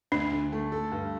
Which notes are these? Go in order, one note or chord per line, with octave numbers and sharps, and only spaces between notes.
D2 D4
D3
A3
A4
G2